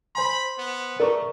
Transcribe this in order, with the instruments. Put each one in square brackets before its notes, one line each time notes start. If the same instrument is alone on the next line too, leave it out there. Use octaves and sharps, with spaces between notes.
[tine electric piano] C5 G#5 C6 [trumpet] B5
[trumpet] B3
[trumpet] A3 [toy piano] G#4 A#4 B4 [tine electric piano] D5 A#5 C#6